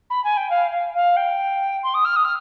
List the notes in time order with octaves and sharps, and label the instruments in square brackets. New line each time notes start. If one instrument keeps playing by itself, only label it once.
[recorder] B5
G#5
G5
F5
F5
F5
G5
C6
D#6
F6
D#6
F6